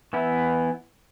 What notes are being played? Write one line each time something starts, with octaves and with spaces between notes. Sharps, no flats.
E3 B3 E4